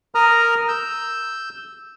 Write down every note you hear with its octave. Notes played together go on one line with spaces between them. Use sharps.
A#4 A#5 D#6 F6
E6 G6